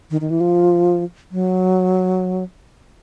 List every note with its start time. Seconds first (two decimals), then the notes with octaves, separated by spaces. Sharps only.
0.11 D#3
0.21 D#3
0.30 E3
0.40 F3
1.31 F#3